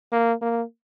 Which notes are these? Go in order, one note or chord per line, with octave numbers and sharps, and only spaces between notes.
A#3
A#3